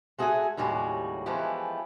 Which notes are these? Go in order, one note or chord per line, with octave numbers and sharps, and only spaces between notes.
G#3 F#4 G#4 A4 E5 G#5
D#2 A2 C#3 G3 G#3 F#4
E3 F3 G#3 A3 B3 G4